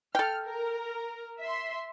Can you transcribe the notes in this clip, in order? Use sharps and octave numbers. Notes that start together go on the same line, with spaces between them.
A4 G5 F6
A#4
E5 C6